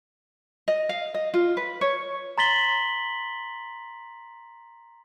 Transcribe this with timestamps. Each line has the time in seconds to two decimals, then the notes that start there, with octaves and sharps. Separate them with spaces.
0.68 D#5
0.89 F5
1.14 D#5
1.34 F4
1.57 B4
1.81 C#5
2.38 A#5 C6 A6 B6 F#7 G7